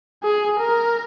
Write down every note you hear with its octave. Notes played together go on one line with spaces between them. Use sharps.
G#4
A#4